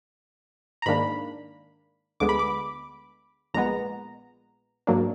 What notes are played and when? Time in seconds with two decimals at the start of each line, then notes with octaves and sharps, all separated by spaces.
0.82 A#5
0.86 G#2 D#3 A#3 D4 B5
2.20 D2 D3 G#3 B3 D6
2.29 B5
2.39 D6
3.54 A#1 A#2 G#3 B3 A#5
4.87 G#2 F#3 A#3 D4